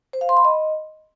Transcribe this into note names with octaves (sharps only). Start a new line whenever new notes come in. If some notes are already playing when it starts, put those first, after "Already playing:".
C5
F5
C6
B5
D#5